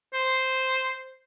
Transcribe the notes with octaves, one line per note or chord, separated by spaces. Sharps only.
C5